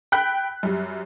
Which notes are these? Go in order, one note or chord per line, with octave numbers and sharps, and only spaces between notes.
G5 B5 F#6 B6
F#2 G3